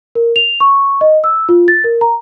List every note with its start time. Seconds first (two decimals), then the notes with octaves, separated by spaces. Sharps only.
0.15 A#4
0.36 F7
0.60 C#6
1.01 D#5
1.24 E6
1.49 F4
1.68 A6
1.84 A#4
2.01 A#5